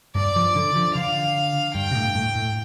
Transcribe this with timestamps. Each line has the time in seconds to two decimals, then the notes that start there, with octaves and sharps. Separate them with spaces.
0.15 G2 D5
0.36 F3
0.56 D3
0.76 F3
0.95 D3 F5
1.75 G2 G5
1.91 C3
1.95 A2
2.15 A2
2.35 A2